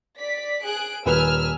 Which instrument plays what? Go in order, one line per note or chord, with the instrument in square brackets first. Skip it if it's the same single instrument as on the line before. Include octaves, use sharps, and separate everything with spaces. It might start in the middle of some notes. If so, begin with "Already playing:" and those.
[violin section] D5 B6
G#4 F#6 D7
[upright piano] D#1 B4 [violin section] G#5 E6 F6